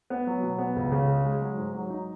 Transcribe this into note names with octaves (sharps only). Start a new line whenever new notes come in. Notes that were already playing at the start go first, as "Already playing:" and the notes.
B3
F#3
B2
B3
C#2
C#3
G#3
G#3
F#3
G#2
F#3
D#4